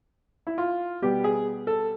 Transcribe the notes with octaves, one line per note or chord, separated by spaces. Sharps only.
E4
F4
B2 G3 B3 G4
G#4
A4